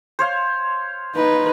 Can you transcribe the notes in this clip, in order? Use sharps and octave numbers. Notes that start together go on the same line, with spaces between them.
C5 C#5 F5
D#4 B4